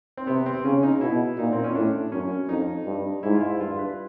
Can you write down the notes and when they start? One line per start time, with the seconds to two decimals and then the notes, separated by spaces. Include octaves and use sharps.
0.17 C4
0.27 C3 B3
0.46 C4
0.64 C#3 C#4
0.83 D#4
1.01 B2 E4
1.38 A#2 D#4
1.52 C4
1.64 C#4
1.75 A2 D4
2.12 F#2 C#4
2.49 F2 D#4
2.86 G2
3.23 G#2 E4
3.35 F4
3.41 E4
3.59 G2 F4
3.79 B4